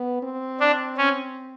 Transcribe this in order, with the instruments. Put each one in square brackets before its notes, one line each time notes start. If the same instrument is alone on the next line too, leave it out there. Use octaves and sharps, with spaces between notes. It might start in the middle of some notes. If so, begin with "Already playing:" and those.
Already playing: [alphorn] B3
C4
[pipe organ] D4
C#4